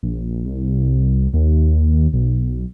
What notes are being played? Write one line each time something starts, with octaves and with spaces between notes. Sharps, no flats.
A#1
C2
D#2
B1